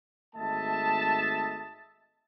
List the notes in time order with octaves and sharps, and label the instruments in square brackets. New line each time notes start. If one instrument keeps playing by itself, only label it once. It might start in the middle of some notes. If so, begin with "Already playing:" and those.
[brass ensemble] G#1 A3 D#5 E5 A5